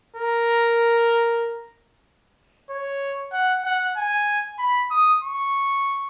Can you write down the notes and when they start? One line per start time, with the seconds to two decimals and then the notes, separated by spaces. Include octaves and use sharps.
0.16 A#4
2.70 C#5
3.32 F#5
3.65 F#5
3.97 G#5
4.59 B5
4.91 D#6
5.23 C#6